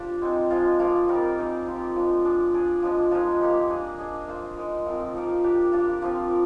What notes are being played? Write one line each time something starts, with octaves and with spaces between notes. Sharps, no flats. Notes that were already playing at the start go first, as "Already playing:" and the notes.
Already playing: D4 F4 G4 C5 D5
G#3 C4 D#4
F3 G#3 D4 F4
F3 A#3 F4 A#4
G3 C4 D#4 A#4
C4 D#4 G#4 D5
F3 G#3 C4 G4
F3 G#3 D4
D4 G#4 D5
D4 G#4 D5
F3 G#3 D4
F3 G#3 D#4 A#4
A#3 D#4 G4
D4 G#4 D#5
D4 G#4 D#5
A#3 F4 C5
G#3 D#4 A#4 D#5
F3 C4 F4 A#4
F3 A#3 D#4 A#4
D4 G4 D5
A#3 D4 F4
F3 C4 F4
A#4